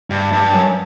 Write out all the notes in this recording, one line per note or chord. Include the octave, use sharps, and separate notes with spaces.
G2
G2
F#2